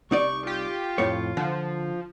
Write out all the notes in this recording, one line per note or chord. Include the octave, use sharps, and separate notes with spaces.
C2 D#4 D5 C#6
F4 G4
F2 A2 C#5
D3 F3